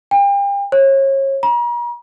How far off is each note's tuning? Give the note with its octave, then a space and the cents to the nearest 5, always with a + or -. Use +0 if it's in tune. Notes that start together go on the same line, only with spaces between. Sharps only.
G5 +35
C#5 -35
A#5 +45